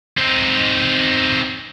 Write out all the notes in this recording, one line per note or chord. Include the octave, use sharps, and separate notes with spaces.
C4 D#4